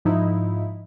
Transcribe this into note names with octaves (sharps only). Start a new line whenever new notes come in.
G#2 F3 D#4 E4